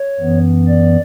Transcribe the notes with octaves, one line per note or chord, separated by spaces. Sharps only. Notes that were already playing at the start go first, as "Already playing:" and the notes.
Already playing: C#5
F#2 E3 B3
D5